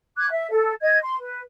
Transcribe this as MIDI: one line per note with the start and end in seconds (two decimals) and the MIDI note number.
0.17 0.27 86
0.17 0.27 90
0.17 0.27 92
0.29 0.50 76
0.51 0.73 69
0.82 0.99 75
0.82 0.99 92
1.02 1.16 84
1.18 1.40 71